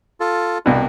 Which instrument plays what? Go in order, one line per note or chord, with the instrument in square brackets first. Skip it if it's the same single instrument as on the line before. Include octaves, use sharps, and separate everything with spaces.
[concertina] F4 A4
[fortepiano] C2 B2 [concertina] D4